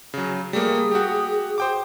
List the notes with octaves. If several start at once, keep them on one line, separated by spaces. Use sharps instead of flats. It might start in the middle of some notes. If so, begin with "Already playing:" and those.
C#3 F#3
G3 A3 A#3 G#4
F#4 G4
C5 G5 D6